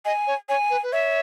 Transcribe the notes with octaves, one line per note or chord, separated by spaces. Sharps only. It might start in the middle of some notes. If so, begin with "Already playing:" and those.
D#5 G#5
C#5
C#5 G#5
B4
B4
C#5 E5